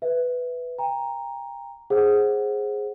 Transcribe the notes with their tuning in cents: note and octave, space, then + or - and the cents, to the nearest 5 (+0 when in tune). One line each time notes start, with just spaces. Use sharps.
B4 +5 E5 +0
G5 +35 A#5 +0
G#4 +0 C5 +25 F#5 +0